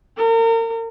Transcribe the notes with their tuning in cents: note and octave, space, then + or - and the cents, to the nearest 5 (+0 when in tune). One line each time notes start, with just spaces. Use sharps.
A#4 -35